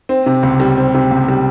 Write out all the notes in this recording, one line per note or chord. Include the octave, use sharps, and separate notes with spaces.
C4
C3
C#2
G3
C4
C3
C#2
G3